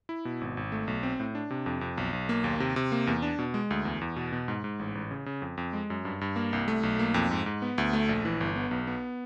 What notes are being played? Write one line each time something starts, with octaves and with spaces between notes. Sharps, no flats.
E4
B2
G#1
G#1
A3
B1
C4
A2
D4
C3
F2
F2
B1
B1
A#3
D#2
C3
C3
A#3
E2
D4
B2
G#3
D2
E2
E2
B2
B2
G#2
G#2
A1
A1
C#3
C#3
F2
F2
G#3
F#2
G2
G2
A#3
C2
A3
B1
A#3
F2
G#2
G#2
B3
D2
A3
A#1
E3
G1
B3
B1
B3